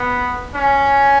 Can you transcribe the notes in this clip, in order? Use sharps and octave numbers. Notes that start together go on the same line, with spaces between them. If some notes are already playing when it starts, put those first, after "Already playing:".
Already playing: B3
C#4